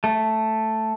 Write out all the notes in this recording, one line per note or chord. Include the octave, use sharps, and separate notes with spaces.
A3